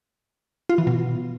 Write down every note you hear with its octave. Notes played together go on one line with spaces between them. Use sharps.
F4
E3
B2